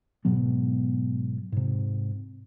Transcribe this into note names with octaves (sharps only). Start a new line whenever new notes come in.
G#2 B2 F#3 B3
G#2 C3